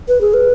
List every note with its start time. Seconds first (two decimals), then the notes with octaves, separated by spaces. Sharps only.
0.08 B4
0.21 G#4
0.34 B4